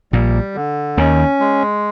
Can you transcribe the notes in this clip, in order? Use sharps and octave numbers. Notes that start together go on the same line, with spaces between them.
A#1 A#2 G3
D3
D#2 D#3 C#4
G#3